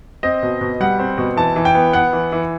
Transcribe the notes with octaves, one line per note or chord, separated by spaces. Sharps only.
C4 D#5
B2
B2
G3 F#5
C4
B2
E3 A5
E3
G5
B3
B3 F#5
E3
E3